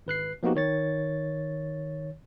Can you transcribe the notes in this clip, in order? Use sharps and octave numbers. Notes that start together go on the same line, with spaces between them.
G#1 B4 F#6 C7
F3 A#3 B3 D#4 F#4 G4
D#3 C#5 A6